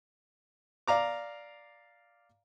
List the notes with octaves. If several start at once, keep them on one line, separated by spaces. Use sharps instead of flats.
D5 F5 A#5 D6